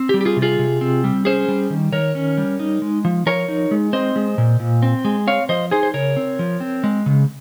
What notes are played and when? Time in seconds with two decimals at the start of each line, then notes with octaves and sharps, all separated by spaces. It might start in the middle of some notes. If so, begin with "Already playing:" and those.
Already playing: C4
0.09 G4
0.14 G3
0.21 G4
0.25 F4 G#4
0.37 C3
0.42 F4 G#4
0.59 C3
0.81 C4
1.04 G3
1.25 C#4 G#4 C5
1.48 G3
1.70 D#3
1.92 D#3 A#4 C#5
2.15 C#4
2.38 G3
2.59 D#4
2.82 G#3
3.05 F3
3.26 F3 A#4 C#5
3.48 D#4
3.71 G#3
3.93 C4 C5 D#5
4.16 G#3
4.38 A#2
4.60 A#2
4.83 C4
5.05 G#3
5.27 C4 C#5 F5
5.49 F3 C5 D#5
5.71 D#4 G#4 C5
5.83 C5
5.94 C#3 A#4 C#5
6.17 C4
6.39 F3
6.60 C4
6.84 G#3
7.06 C#3